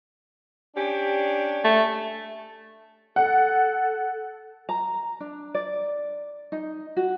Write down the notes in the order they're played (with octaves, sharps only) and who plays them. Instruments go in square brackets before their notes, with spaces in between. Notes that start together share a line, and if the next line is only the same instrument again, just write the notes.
[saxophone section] C#4 D4 G4
[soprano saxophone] A3
[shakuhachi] A4 [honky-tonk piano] F#5
[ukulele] A#5
D4
D5
D#4
F#4